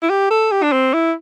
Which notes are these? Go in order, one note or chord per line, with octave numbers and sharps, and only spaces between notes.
E4
G4
A4
G4
D4
C4
E4